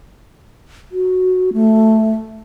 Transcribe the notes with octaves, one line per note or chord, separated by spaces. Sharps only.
F#4
A3